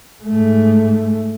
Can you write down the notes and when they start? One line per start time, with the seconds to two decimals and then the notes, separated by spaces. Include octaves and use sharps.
0.24 G#2 A3